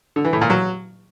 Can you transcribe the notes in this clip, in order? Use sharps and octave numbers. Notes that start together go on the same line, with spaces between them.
D3
E3
A2
A#2
F#3